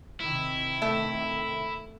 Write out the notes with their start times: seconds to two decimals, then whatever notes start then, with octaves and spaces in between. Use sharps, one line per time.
0.20 C3 D#3 C4 E4
0.82 A3 A4 E5